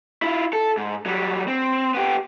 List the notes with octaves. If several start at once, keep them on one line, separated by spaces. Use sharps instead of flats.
E4 F4
A4
G#2
F#3 G3
C4
B3 G4